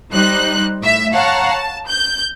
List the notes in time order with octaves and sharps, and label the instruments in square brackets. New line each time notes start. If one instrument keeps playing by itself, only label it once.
[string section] G3 D#4 C5 F#6
A2 E5
C#5 F5 F#5 A5 A#5
A5
G6